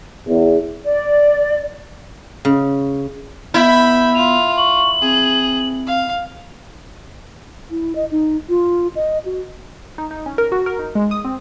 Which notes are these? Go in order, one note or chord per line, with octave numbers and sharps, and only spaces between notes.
E2
D5
C#3
B3 E4 E5 B5 G6
F4 F7
C#6 F#7
C4 G#4
F5
E4
D#5
D#4
F4
D#5
F#4
D#4
D#4
C#4
A#4
F#4
A#4
D#4
G#3
D#6
C4